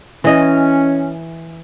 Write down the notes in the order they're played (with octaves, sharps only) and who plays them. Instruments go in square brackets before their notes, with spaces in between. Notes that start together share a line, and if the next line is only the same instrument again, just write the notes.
[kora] E3 D#5 [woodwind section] C#4